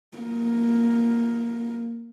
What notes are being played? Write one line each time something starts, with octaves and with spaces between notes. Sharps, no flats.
A#3